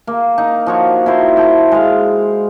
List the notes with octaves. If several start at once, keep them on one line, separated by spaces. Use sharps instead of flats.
A#3
D#4
F3 F#4 C#5
E4 F#4 C5
G5 A5
G#3 F5